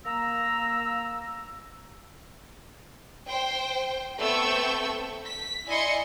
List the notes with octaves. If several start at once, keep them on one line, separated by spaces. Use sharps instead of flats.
A#3 A#5 E6
C5 G5
A3 B3 C4 C#6 E6 G6
B6
E4 D5 D#5 G#5 C6 C#7